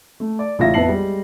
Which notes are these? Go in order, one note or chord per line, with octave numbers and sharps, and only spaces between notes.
A3
D5
A1 C#3 C#4 F4 E5 A#6
F2 B3 E5 A5 C7 F#7
G3 G#3